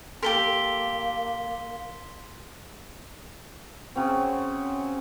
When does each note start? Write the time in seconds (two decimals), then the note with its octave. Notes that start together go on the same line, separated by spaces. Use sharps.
0.23 A#3 G4 A4 A#4 C6 B6 G7
3.96 C#3 F#3 C4